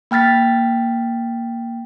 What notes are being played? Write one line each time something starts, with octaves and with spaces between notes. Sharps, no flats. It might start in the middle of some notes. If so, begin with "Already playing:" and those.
A#3 G5 F6 A6 B6